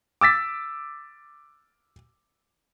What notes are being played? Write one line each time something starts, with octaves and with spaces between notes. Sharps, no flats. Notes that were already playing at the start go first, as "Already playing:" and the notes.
D6 E6 A6 B6